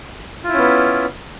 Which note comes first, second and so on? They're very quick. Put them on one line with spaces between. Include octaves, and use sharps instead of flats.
F4 E4 C#4 B3